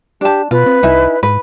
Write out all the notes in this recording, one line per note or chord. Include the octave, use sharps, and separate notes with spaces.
D4 G4 A5
B2 F4 B4
C4
C2 D#4 E4 G#5
G#2 B4